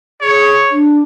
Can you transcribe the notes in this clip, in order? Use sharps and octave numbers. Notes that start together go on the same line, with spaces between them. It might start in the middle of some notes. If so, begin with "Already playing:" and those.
G#4 C#5
D4